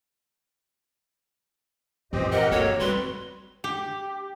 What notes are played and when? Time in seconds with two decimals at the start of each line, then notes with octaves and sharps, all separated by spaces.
2.13 F#2 A#2 E3 C4 G4 C5 D#5
2.32 G4 A#4 D#5 F#5
2.52 A#3 D4 F#4 A4 C#5
2.80 F1 G3 C4 F#4 B4 C6
3.64 G4